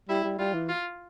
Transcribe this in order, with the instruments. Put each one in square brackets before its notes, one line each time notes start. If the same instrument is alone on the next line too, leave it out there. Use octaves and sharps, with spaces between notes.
[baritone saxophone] G3 [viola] E4
[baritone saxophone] G3
[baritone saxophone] G3 [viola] F4
[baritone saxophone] E3
[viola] F4